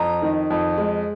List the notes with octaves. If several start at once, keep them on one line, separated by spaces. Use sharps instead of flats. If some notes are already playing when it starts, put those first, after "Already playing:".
Already playing: F2 A#5
D#3
F2
G#3